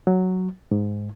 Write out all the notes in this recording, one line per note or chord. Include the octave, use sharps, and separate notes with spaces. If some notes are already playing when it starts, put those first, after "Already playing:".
F#3
G#2